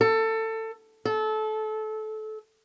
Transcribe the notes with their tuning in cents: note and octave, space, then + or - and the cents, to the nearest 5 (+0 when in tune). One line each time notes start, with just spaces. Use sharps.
A4 +20
A4 -25